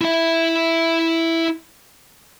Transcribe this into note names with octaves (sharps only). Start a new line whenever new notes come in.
E4 E5